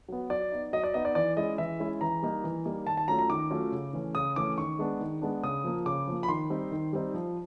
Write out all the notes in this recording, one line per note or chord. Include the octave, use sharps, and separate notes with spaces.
F#3 B3
F#3 D5
B3 D#4
F#3 D#5
D5
B3 D#4 D#5
D5
E3 D5
G#3 C#4 E4 D#5
E3 E5
G#3 C#4 E4
E3 A#5
G3 A#3 D#4
E3
G3 A#3 D#4
D#3 A5
A5
F#3 A3 C#4 F4 A#5
A#5
D#3 D6
F#3 A3 C#4 F4
C#3
E3 A3 C#4
C#3 D#6
E3 A3 C#4 D6
D#3 C#6
G#3 B3 D4
D#3
G#3 B3 D4
C#3 D#6
F3 A#3
C#3 D6
F3 A#3
B5
D#3 C6
G3 C4 D#4
D#3
G3 C4 D#4
F3